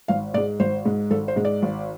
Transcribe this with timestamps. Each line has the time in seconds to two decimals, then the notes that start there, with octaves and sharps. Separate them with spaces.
0.08 G#1 F5
0.34 G#2 D5
0.37 G#3
0.60 G#1 C5
0.85 G#2 G#3
1.10 G#1 A4
1.28 C5
1.36 G#2 G#3
1.45 D5
1.62 G#1